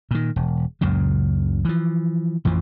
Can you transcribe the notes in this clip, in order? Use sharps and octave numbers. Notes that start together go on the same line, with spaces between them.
A#2 D#3
E1
C#2 F#2 A#2 C#3
E3 F3
A1 F2 E3 F3